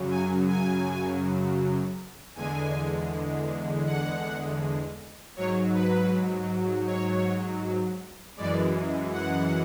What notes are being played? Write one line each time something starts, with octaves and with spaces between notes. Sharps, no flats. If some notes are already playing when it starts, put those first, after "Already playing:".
Already playing: F#2 C#3 F#3
G#5
G#5
E2 D3 G#3 G#5
F#5
G#2 F#3 C#5
B4
C#5
F#2 E3 G#3 D5
F#5